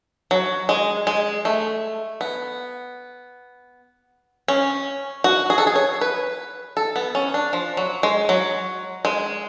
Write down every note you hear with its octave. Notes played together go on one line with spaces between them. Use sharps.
F#3
G#3
G#3
A3
B3
C#4
F#4
G#4
A4
G#4
C#5
B4
A4
B3
C#4
D4
F3
F#3
G#3
F#3
G#3